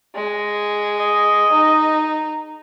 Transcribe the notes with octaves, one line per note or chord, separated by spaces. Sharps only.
G#3
D#5
D#4